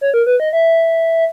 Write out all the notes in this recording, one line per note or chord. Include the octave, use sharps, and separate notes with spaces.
C#5
A#4
B4
D#5
E5